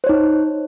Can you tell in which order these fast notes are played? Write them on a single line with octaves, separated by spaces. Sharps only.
C5 C#5 D#4